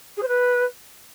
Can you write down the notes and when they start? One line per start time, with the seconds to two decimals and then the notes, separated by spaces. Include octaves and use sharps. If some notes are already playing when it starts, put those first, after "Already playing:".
0.17 G#4
0.22 C5
0.27 B4